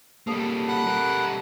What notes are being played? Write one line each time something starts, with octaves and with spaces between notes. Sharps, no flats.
G3 A#3 A4 D#5
F#5 B5 F#6
G3 A#4